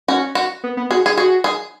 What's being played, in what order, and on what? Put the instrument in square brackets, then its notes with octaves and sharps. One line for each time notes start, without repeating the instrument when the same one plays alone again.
[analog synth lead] C#4 [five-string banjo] F#4
[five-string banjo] F#4
[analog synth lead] B3
B3
[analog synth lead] F#4 [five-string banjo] G#4
[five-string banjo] G#4
[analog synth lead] F#4 [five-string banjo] G#4
[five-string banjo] G#4